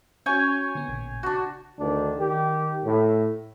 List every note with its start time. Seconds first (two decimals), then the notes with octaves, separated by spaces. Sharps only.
0.26 C#4 F#4 C#5 G5 G#5
0.75 D3 B3
0.88 A1 A#2 C#3
1.23 D4 F#4
1.79 D2 D#3 D4
2.18 D#3 G4
2.84 A2